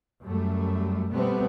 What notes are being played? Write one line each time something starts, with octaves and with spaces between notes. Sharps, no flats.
F#2 G3 A3
B2 G3 A3 B3 C4